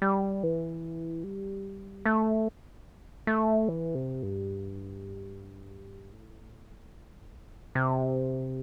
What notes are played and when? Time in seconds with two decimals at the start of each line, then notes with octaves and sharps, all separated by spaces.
0.02 G3
0.43 E3
1.24 G3
2.05 A3
3.27 A3
3.69 E3
3.95 C3
4.23 G2
6.13 A2
7.75 C3